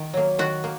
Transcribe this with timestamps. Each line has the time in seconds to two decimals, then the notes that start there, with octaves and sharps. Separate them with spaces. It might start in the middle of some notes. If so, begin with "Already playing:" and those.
Already playing: D#3
0.14 F#3 A#3
0.39 D#3 F#4
0.64 A#3